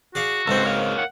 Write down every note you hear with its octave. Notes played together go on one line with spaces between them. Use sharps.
F#4 G#4 D5 F5
C#2 G#2 C4 A4 C5
A#4 C#5 F5
F#5